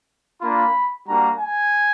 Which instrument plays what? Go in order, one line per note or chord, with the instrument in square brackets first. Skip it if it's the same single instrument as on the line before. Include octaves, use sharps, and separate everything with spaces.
[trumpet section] A#3 D4 F4 B5
G3 A#3 D4 F#4 A#5
G#5